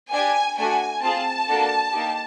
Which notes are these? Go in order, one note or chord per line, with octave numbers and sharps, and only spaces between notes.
D4 G4 G#5
A3 D4 F#4 G#5
C4 F4 G#4 A5
A#3 D4 F#4 A4
A#3 D#4 G4